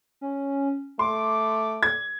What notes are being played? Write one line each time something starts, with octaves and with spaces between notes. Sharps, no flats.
C#4
A3 C6 D6
G#6